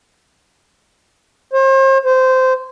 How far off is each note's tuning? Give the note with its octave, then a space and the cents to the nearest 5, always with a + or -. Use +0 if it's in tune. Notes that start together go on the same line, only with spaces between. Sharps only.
C5 +40
C5 -15